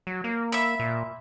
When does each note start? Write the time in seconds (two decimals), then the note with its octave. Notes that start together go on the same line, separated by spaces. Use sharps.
0.07 F#3
0.24 A#3
0.52 E5 B5
0.80 A#2